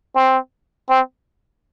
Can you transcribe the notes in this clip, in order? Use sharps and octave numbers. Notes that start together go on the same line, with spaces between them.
C4
C4